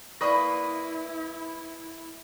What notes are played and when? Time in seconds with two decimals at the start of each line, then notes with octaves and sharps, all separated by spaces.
0.21 A#3 E4 B4 D5 B5 C#6 D#6 A#6